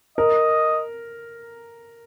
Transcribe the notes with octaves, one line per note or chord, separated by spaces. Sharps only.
A#4 D#5